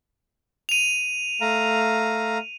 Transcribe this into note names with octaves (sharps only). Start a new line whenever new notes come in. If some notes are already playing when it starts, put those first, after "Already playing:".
D#7 F7
A3 F5 A#5